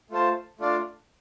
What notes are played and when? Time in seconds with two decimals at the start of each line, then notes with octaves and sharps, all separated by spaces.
0.11 A3 F4 C5 A5
0.59 A3 D4 F4 D5 F5